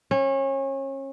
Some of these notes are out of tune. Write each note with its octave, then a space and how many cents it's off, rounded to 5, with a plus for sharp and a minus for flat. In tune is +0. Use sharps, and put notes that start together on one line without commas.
C#4 -30